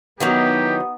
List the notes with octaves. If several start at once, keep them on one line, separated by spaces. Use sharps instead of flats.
D#3 E3 F#3 B3 D#4 G4 F#5 D#6